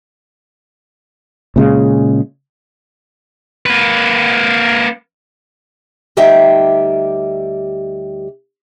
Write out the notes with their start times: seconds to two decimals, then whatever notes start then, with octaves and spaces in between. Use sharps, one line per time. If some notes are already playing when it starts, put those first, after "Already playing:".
1.56 A#2 C#3 G#3
3.66 A#3 B4
6.17 D2 G3 D#4 G4 E5 G5